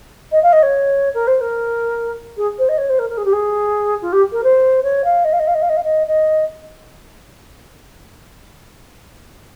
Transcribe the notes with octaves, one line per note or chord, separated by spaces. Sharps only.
D#5
F5
D#5
C#5
A#4
C5
A#4
G#4
C5
D#5
C#5
C5
A#4
A#4
G#4
G4
G#4
F4
G4
A#4
C5
C#5
F5
D#5
F5
D#5
F5
D#5
F5
D#5
F5
D#5
D#5